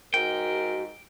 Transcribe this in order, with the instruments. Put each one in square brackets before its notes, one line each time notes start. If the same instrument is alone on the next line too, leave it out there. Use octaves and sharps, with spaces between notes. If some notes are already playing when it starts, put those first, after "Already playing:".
[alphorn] G#2 [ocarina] F#4 [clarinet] A#4 [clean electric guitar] G5